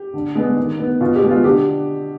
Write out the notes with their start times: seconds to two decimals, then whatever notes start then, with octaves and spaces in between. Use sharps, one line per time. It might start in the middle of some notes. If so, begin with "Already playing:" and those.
Already playing: G4
0.14 D3
0.35 G#3 B3
0.57 D#3
0.79 B3
1.01 B2 F4
1.15 G4
1.23 G#3 B3
1.30 F4
1.44 D3 G4